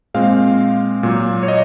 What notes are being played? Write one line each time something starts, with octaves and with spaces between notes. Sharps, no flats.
A#2 G#3 C4 F5
A#2 F#3 A#3
C#5
D#5